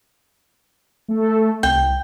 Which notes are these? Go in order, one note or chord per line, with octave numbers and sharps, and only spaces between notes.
A3 A4
C2 G5